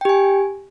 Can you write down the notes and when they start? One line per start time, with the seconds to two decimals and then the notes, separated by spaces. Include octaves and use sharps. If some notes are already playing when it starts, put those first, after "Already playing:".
0.01 G5
0.05 G4
0.09 G#5